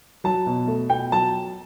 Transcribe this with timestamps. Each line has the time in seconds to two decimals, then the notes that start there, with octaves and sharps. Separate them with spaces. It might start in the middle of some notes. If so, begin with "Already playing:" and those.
0.24 F#3 A5
0.46 B2
0.67 A3
0.89 B2 G5
1.12 F#3 A5